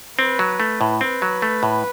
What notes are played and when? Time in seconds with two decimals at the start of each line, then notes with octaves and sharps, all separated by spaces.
0.19 C4 B4
0.39 F#3
0.60 A3
0.81 A2
1.01 C4 B4
1.22 F#3
1.42 A3
1.63 A2